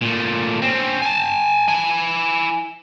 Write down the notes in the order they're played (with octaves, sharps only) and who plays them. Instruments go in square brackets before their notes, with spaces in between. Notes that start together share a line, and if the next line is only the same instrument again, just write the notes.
[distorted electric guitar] A#2 A3
C4 C#4
G#5 A5
E4 G#5